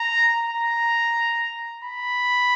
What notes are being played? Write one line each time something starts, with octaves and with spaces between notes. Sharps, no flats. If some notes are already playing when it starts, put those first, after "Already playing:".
Already playing: A#5
A#5
B5